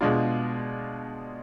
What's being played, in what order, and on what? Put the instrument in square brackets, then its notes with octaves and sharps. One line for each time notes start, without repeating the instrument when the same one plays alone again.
[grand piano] B2 G#3 D4 F4